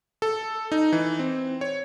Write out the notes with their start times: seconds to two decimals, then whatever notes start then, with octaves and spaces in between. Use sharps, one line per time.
0.22 A4
0.72 D#4
0.92 E3
1.19 C4
1.61 C#5